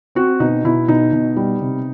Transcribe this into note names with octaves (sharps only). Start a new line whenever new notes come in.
C4 F#4
B2 D#4
B2 E4
B2 D#4
B2
G3
C3